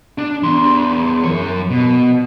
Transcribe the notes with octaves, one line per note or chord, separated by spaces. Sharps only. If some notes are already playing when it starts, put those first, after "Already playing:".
D4
E2 C6
F#2 C#5
B2